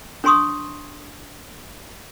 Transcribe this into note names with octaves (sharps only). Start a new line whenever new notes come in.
D4 C#5 G#5 C6 C#6 D#6